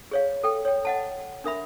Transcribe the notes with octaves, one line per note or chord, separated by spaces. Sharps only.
G#4 C#5 F5
A4 G5
C#5 G5
D#5 F#5 A5
D4 A#4 E5 B5